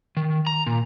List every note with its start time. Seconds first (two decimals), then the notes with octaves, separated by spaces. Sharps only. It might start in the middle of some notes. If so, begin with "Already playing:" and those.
0.17 D#3
0.47 A#5
0.67 A#2